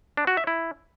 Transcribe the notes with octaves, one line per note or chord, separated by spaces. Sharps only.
D4
F#4
E5
E4